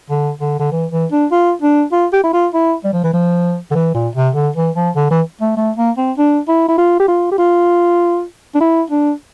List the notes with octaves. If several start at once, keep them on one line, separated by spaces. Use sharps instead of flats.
D3
D3
D3
E3
E3
D4
F4
D4
F4
G4
E4
F4
E4
G3
F3
E3
F3
D3
E3
A#2
C3
D3
E3
F3
D3
E3
A3
A3
A#3
C4
D4
E4
E4
F4
G4
F4
G4
F4
D4
E4
D4